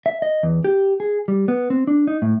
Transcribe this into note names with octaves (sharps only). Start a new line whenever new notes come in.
E5
D#5
E2
G4
G#4
G3
B3
C4
D4
D#4
A2